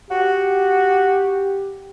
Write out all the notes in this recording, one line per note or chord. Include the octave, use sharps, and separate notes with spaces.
F#4 G4